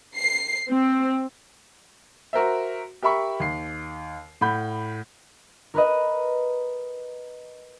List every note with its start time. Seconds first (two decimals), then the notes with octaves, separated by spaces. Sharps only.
0.16 C7
0.68 C4
2.33 F#4 A#4 C5 E5
3.02 G4 A#4 E5 B5 C#6
3.40 D#2 C7
4.41 A2 F#5 B5 G6
5.74 A#4 B4 D#5